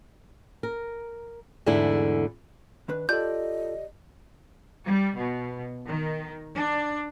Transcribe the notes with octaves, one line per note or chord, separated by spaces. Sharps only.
A#4
E2 G#2 D3 A3 E4
D#3 D4 B4
F4 G4 A4 D5 D#5 A5 G6
G3
B2
D#3
D4